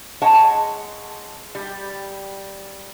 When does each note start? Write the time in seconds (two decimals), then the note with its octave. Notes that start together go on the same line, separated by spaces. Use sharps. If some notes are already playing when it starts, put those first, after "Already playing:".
0.22 G#3 C#5 F#5 A5
1.55 G3